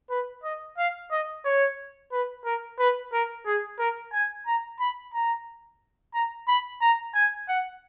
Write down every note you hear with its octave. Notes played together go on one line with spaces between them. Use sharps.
B4
D#5
F5
D#5
C#5
B4
A#4
B4
A#4
G#4
A#4
G#5
A#5
B5
A#5
A#5
B5
A#5
G#5
F#5